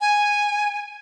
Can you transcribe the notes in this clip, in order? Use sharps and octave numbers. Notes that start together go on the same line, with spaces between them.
G#5